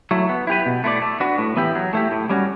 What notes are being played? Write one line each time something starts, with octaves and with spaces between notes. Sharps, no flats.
F#3 A3 E4
B3
E4 G4 B4
B2
A3 E4 B4 D5
A3
D4 F#4 B4
A2
E3 B3 E4 G4
F#3
A3 E4 G4
A2
G3 C#4 F#4